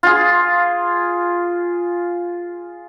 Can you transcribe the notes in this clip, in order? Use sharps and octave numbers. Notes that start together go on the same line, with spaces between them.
F4 G#4